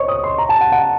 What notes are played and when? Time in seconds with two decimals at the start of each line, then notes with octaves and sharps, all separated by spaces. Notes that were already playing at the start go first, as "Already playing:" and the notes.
Already playing: C5 C#5 D#5 C#6
0.08 D#6
0.24 C6
0.38 A#5
0.49 A5
0.61 F#5
0.72 F#5